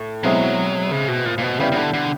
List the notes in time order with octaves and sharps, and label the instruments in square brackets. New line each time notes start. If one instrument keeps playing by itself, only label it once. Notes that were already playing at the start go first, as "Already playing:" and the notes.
Already playing: [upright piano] A2
[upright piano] B2 G#3 C4 E4 [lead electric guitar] F#3
[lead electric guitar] C#3
B2
A#2
A#2
B2
[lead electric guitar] C#3 [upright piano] G3 B3 E4 G4 B4
[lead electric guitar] C#3
D3
D3